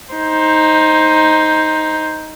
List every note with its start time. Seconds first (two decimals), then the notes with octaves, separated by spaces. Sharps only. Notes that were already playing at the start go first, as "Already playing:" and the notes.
0.13 D#4 C5